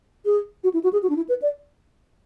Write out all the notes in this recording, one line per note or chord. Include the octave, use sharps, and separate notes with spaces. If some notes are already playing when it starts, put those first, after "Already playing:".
G#4
F#4
E4
F#4
G#4
F#4
D4
E4
B4
D5